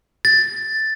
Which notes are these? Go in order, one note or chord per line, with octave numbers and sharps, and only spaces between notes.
A6